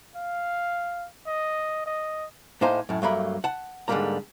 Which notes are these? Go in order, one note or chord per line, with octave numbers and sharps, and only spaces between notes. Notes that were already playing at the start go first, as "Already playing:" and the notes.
F5
D#5
D#5
A2 A#3 D#4 C5 G#5 A#5
F#2 A2
G2 F#3 A3 A#3 A#4 B5
F#5 A5
G#2 D3 D#3 G3 A#3 A#5